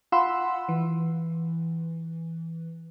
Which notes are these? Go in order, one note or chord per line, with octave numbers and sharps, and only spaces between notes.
F4 F#5 B5 C6 E6
E3